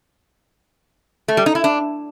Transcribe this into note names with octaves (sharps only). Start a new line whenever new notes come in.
A3
G3
D#4
E4
D4